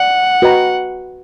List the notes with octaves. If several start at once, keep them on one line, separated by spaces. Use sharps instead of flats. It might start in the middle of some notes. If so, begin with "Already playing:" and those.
Already playing: D5 F#5
F#4 B4 D#5 G5 A#5